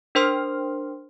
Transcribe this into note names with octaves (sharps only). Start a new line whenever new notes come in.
D4 A#4 C5 G5 C6 F6